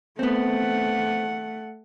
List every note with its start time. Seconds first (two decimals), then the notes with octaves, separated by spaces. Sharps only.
0.19 A3 B3 C4 F#5